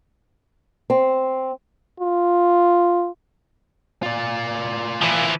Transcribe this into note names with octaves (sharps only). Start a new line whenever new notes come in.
C4
F4
F4 D5
E3 F3